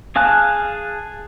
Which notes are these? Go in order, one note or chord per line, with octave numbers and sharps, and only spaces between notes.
G#4 F5 G#5 A5 F#6